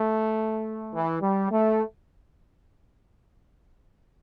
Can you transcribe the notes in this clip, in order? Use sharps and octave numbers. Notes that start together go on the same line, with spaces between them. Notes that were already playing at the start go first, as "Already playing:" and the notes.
Already playing: A3
E3
G3
A3